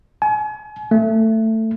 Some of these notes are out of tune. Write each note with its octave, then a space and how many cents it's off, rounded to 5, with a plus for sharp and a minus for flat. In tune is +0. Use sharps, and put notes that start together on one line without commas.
G#5 +35
A3 +15